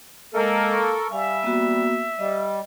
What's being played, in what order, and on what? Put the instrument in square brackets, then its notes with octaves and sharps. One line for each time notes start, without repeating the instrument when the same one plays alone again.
[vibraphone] G#3 D#5 [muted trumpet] A#3 [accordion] A4 A#4
[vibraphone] C#6
[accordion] G3 [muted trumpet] E5 [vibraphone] F5 G#5
[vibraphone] A#3 B3 F#4
[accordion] G3 [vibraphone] D#5